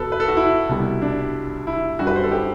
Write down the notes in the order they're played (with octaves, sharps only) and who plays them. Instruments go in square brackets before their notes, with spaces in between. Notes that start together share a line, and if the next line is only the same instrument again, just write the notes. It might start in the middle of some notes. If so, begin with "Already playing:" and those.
Already playing: [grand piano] E2 B2 F#3 A4 B4
B4
A4
F#4
E4
C2 B2 G3
D4
E4
F#2 D3 G3 F#4
B4
C5
A4
G4